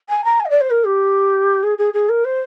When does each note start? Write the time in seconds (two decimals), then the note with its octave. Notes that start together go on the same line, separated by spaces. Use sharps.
0.09 G#5
0.24 A#5
0.40 G#5
0.45 D#5
0.50 D5
0.60 C5
0.70 A#4
0.85 G4
1.63 G#4
1.78 G#4
1.93 G#4
2.09 A#4
2.24 C5